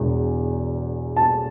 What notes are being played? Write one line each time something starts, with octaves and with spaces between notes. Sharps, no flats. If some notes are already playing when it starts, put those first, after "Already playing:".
Already playing: E1 E2
A5